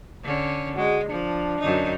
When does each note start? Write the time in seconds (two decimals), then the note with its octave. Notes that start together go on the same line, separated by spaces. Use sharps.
0.23 D3 C#4
0.77 G#3 F#4
1.09 F3 D4
1.60 F#2 D3 D#4